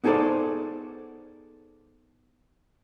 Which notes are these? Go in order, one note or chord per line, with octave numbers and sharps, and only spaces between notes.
B3 D#4 G#4 A4 C5 D5